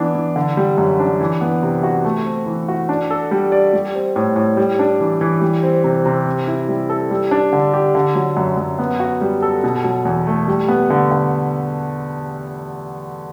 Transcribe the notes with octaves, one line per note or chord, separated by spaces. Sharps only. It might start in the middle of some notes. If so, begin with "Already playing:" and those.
Already playing: E3 B3 D4
E3
D3
G3
F#2
D4
E3
B3
C3
F#4
A3
C4
E3
F#4
D4
A4
G3
D5
G3
C4
A2
A2
G3
D4
E3
E3
G3
C4
C3
C3
C4
E4
G3
A4
G3
D4
D3
G4
D3
F#3
F#2
F#2
B3
F#4
G3
A4
B2
F#3
E2
A3
G3
B3
D3
D3